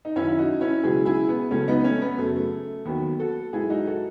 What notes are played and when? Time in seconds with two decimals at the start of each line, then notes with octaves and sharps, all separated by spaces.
0.05 D#4
0.16 F#2 D#3 F#3 C#4 E4
0.28 E4
0.38 D#4 F#4
0.61 C#4 E4
0.83 C#2 B2 F#3 E4 G#4
1.06 E4 G#4
1.28 B3
1.51 C#2 C#3 F#3 A3 C#4
1.68 B3 D#4
1.84 A3 C#4
2.01 B3
2.18 F#2 C#3 F#3 A3
2.36 A3
2.85 D#2 D#3 F#3 B3
3.19 F#4 A4
3.53 G#2 F#3 E4 G#4
3.70 D#4 F#4
3.87 F#4 A4